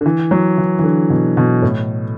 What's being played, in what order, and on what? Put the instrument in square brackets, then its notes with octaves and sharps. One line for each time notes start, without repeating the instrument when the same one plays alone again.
[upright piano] D3
E3
F#3
E3
E3
D3
B2
B2
A2